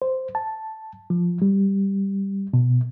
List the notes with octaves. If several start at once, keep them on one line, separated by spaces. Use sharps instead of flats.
C5
A5
F3
G3
B2